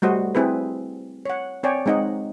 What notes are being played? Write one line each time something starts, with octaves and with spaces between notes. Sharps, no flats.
G3 A3 F#4 C5 D#5
C4 E4 G#4 B4
C#5 F#5
C4 C#5 D5 G5 G#5
G#3 C4 D#4 D#5 F#5